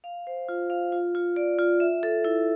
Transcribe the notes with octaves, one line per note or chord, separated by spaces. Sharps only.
F5
C5
F4
F5
F4
F4
D5
F4
E5
A4
E4